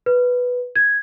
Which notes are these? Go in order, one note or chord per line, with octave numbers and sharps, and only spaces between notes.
B4
G#6